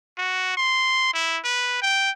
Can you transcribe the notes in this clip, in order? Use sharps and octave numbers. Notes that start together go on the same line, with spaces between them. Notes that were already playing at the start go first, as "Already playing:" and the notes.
F#4
C6
E4
B4
G5